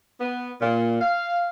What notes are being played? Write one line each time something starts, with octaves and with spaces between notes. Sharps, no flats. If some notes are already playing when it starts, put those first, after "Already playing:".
B3
A#2
F5